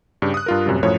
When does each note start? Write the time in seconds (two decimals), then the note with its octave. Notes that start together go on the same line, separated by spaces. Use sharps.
0.22 G2 C#3 G4
0.34 D#6 F#6
0.46 G2 F4 A#4
0.66 A1 F#2 C3 G3
0.83 F#2 A2 F3 C#5